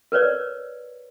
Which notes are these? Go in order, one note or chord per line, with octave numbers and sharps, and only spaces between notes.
A#4 B4 C#5 D5